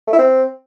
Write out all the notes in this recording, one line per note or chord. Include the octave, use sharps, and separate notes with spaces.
A3
E4
C4